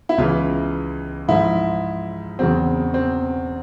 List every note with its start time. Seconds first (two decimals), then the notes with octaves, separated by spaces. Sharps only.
0.09 E4
0.18 C#2 C#3 E3 F4
1.28 G#2 F3 E4
2.39 E2 C#3 F#3 C4
2.94 C4